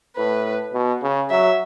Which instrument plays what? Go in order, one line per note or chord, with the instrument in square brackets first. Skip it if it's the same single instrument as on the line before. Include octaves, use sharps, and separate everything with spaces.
[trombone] A2 [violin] B4
[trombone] B2
C#3
[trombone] F#3 [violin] E5